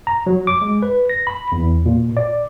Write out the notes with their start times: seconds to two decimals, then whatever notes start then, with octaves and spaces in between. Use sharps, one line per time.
0.07 A#5
0.27 F#3
0.47 D6
0.62 G#3
0.82 B4
1.09 A#6
1.27 B5
1.52 E2
1.86 A#2
2.17 D5